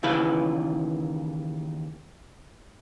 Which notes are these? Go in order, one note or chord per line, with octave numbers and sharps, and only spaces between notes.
D#2 C#3 E3 E4 B4 F5